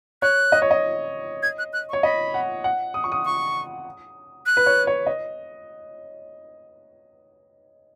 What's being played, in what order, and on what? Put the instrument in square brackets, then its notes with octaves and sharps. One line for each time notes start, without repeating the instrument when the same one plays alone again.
[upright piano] C#5 [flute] F#6
[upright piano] D#5
C#5
D#5
[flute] G#6
F#6
F#6
C#6
[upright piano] C#5
[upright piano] D#5 [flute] B5
[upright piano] F#5
F#5
D#6
C#6
D#6
[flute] C#6
F#6
[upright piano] B4
C#5
C#5
D#5